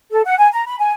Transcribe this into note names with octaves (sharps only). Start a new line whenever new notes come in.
A4
F#5
G#5
A#5
B5
G#5